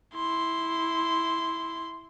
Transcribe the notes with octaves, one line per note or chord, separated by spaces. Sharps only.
E4 C6